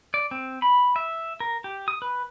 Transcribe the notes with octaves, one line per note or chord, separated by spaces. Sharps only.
D5
C4
B5
E5
A#4
G4
D#6
B4